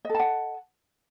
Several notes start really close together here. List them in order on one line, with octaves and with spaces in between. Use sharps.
D#5 A4 A5 F#5